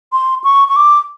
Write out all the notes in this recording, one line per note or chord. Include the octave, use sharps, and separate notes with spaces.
C6
C#6
C#6
D6